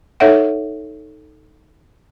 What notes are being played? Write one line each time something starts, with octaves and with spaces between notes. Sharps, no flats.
D#4 A4 C#5 E5 F#5